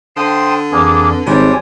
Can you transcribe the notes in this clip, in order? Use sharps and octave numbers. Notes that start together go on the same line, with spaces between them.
D3 C5 F5 G5 A5 C6 D#6
F2 E3 A#3 D4 G#4
G#1 G3 C4 D4 C#5 G#5